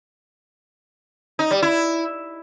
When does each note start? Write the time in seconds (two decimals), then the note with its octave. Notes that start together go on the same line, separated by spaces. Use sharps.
1.39 D#4
1.51 G3
1.62 E4